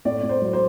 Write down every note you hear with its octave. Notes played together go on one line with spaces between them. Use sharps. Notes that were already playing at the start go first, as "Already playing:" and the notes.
A2 D5
A2
C5
F#3
C5